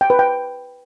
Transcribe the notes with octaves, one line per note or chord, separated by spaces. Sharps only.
G5
B4
G5